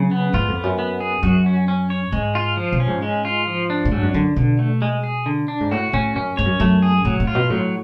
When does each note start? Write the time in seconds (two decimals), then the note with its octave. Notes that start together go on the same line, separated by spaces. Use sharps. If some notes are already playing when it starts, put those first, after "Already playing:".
Already playing: C#3 F#3
0.11 B3
0.33 G#2 F4
0.48 F2
0.56 B3
0.63 F#2
0.79 B3
1.00 G#4
1.23 F#2 F#4
1.46 C#4
1.68 C#4
1.90 C#5
2.12 G#2 G#3
2.35 F4
2.57 F3
2.72 B2
2.80 C#4
2.87 G#2
3.02 G#3
3.25 F4
3.47 F3
3.70 D4
3.85 A2
3.92 G#2 F#3
4.03 F#2
4.14 F#2 D3
4.36 B2 D3
4.59 A3
4.82 G#3
5.04 G#4
5.26 D3
5.48 D4
5.60 G#2
5.71 A2 F#4
5.93 A2 C#4
6.15 F#2 C#4
6.37 G#2 C#5
6.45 F#2
6.60 F#2 A3
6.82 G#4
7.05 A2 F#3
7.20 A2
7.27 F4
7.35 B2
7.50 A2 F#3